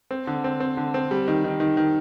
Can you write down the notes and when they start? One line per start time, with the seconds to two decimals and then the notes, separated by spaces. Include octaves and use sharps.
0.11 C4
0.27 D3
0.44 C4
0.60 C4
0.77 D3
0.94 C4
1.11 G3
1.28 D#3
1.44 D#3
1.60 D#3
1.77 D#3